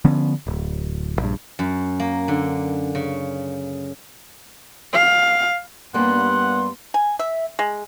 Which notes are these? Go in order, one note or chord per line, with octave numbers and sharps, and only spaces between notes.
D3 F3 B3 C#4
D1
A#1 G2
F#2
A#3
D3
C#3
F5
G2 G3 A#3 B3 C#4 F#5 C6
G#5
E5
G#3